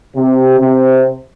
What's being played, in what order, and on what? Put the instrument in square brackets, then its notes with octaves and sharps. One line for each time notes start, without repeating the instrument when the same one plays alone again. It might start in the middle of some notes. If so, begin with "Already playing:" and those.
[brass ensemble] C3
C3